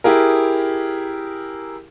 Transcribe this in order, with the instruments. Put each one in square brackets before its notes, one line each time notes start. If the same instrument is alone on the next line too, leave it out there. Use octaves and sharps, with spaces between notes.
[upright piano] E4 G4 G#4 A#4